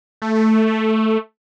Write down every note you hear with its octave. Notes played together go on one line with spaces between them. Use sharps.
A3